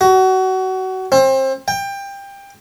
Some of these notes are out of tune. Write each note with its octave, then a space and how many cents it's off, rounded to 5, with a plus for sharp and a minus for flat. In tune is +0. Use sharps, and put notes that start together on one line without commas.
F#4 +25
C4 +30
G5 +20